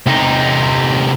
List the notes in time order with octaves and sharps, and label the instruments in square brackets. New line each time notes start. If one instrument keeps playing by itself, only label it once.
[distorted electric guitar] C3 D#4